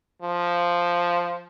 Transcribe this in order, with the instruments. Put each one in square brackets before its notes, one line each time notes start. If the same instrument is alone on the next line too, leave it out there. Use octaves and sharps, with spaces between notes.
[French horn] F3